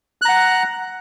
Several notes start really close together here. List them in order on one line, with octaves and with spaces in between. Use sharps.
F#6 A#5 F#5